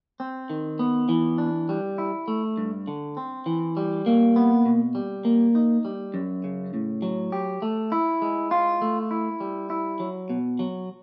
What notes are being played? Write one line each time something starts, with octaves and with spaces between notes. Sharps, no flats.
C4
D#3
B3
E3
D4
G3
E4
A3
G2
D3
C4
E3
G3
A#3
B3
B2
G3
A#3
D#4
G3
F#2
C#3
A2
F#3
G4
A3
E4
G#3
F4
A3
E4
G3
E4
F#3
B2
F#3